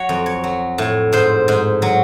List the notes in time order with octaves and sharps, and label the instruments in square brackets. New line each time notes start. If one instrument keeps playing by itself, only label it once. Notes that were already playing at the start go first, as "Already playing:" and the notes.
Already playing: [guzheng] F#3 C#5
F2
C#5
F#3
A2
G#2 C5
G#2
F#3